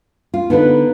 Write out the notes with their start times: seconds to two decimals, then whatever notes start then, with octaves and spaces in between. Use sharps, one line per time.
0.34 F4
0.50 D3 B3 D#4 B4